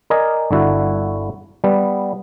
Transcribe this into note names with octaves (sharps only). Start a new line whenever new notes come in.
A#4 D5 D#5 G#5
G1 D3 E4 F#4
G3 B3